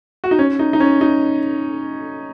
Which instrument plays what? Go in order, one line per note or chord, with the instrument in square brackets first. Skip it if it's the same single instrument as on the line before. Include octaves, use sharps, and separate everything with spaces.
[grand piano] F#4
D#4
C#4
D#4
D#4
C#4
D#4